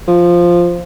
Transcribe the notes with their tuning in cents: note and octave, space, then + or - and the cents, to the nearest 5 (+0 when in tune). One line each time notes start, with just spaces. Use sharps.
F3 +0